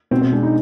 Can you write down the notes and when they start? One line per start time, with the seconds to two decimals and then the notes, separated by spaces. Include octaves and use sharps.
0.11 B2 C4
0.22 C4
0.32 G#3 D4
0.43 D#4